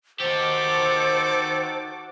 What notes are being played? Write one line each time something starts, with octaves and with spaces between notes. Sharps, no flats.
D#3 F#4 G4 A4 C5 A5 D6